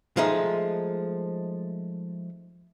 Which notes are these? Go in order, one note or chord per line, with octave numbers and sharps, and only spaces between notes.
F3 G#3 A3 D#4